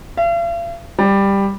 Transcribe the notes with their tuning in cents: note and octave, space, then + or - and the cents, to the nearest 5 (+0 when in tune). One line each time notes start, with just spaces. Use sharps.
F5 -45
G3 +10